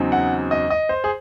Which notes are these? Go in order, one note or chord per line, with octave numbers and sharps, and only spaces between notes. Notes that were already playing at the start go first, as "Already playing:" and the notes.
Already playing: E2 C#3 F#3 C4 D#4
F#5
D#5
D#5
C5
G#4